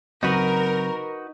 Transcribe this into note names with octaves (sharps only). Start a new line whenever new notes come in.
C#3 F#3 C4 D#4 F#4 A#4 B4